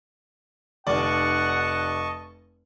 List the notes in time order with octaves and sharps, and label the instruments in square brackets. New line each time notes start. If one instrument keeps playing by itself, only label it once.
[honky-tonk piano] F1 D5 [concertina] D#5 A5 C#6 [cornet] F#5